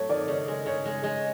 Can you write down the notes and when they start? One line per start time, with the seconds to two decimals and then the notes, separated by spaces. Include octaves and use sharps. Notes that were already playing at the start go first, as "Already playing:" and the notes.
Already playing: F#3 A3 C#5
0.09 D#3 D5
0.28 C#3 C#5
0.48 G#3
0.66 C#3 C#5
0.85 G#3
1.04 G#3